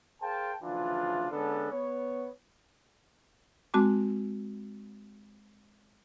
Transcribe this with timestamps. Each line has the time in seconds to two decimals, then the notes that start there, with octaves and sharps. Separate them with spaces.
0.22 G#4 A#4 C5 F5 G5 A5
0.63 D2 C#3 E3 F3 D4 F4
1.32 D3 G#3 B3 C#4 D4 A4
1.71 B3 C#5
3.74 G#3 C4 F#4 A5 D6